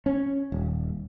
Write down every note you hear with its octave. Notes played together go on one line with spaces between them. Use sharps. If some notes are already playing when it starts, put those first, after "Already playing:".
C#4
D#1